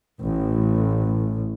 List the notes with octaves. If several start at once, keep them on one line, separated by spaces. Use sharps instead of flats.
A1